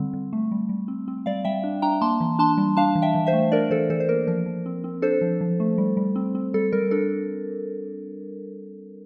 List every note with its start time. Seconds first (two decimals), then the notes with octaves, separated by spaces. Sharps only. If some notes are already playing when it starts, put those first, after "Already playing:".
Already playing: D3 G3 C4
0.13 D3
0.33 A3
0.51 G3
0.69 G3
0.88 C4
1.08 C4
1.26 G3 D5 F5
1.45 G3 E5 G5
1.64 D4
1.82 D4 G5 A#5
2.01 A#3 A5 C6
2.20 E3
2.39 D4 A5 C6
2.58 G3
2.77 D4 F5 A5
2.95 E3
3.02 E5 G5
3.15 E3
3.27 C5 E5
3.33 A3
3.52 D4 A#4 D5
3.71 E3 A4 C5
3.90 E3 A4 C5
4.00 C5
4.09 A#3 A#4
4.27 F3 A#4
4.46 F3
4.66 C4
4.84 C4
5.02 D4 A4 C5
5.21 F3
5.41 F3
5.60 A3
5.78 G3
5.97 G3
6.16 C4
6.35 C4
6.54 G3 A4
6.72 G3 A#4
6.91 D4 A4